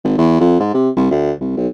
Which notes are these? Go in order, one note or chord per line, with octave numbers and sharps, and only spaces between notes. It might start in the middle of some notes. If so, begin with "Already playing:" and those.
G#1
E2
F2
G#2
C3
C2
D2
C2
B1